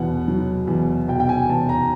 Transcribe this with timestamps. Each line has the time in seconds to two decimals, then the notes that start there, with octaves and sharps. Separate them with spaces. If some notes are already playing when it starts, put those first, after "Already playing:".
Already playing: E2 B2 F#5
0.28 F#3
0.68 E2
1.08 B2 G5
1.20 G5
1.29 G#5
1.50 E2 A5
1.69 A#5